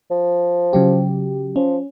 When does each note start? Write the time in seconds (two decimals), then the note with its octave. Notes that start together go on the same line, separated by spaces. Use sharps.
0.11 F3
0.73 C#3 F#3 G4
1.56 F3 C#4